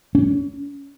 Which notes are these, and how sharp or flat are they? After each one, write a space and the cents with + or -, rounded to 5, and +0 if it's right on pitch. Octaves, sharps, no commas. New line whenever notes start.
C#4 +30